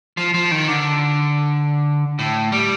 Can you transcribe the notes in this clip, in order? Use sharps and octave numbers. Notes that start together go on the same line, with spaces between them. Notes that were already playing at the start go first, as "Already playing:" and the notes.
F3
F3
D#3
D3
A2
G3